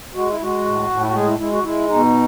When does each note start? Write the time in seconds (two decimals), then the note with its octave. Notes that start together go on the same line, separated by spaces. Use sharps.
0.15 G#3 F#4
0.29 E4
0.40 G#3 F#4
0.65 A2
0.90 A2
1.00 E4
1.07 F#4
1.14 G#3 G#4
1.26 E4
1.39 G#3 E4
1.52 F#4
1.63 G#3 E4
1.88 B2 D#4